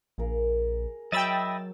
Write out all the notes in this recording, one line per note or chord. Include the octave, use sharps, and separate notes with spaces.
A#1 G#4 A#4
F#3 D#5 E5 G5 B5 E6 A6